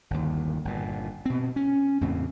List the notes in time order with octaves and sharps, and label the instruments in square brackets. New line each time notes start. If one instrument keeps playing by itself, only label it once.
[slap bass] G1 D#2
G1 A#2
B2 C4
C#4
E2 A2 C#3 C4